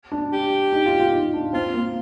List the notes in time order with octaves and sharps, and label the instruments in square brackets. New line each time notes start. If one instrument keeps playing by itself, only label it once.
[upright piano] D4
[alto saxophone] G4
[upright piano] D#4
F4
F4
D#4
D4
[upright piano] C4 [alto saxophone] F4
[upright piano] A#3